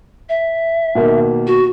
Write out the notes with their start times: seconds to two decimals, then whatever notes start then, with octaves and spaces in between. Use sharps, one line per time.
0.29 E5
0.95 B2 D#3 A#3
1.47 F#4